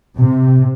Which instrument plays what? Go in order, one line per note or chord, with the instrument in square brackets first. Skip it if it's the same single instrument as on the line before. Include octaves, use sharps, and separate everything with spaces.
[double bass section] C3